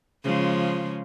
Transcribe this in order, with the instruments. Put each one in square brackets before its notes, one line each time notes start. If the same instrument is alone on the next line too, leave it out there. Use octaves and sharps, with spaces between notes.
[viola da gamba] C#3 F3 G#3